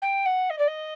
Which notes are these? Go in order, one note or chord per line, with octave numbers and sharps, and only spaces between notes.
G5
F#5
D#5
D5
D#5